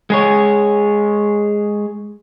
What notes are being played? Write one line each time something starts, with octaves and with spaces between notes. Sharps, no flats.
G#3 G#4 C#5